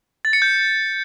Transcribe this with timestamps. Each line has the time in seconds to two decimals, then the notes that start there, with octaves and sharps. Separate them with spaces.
0.25 A6
0.33 C#7
0.42 G6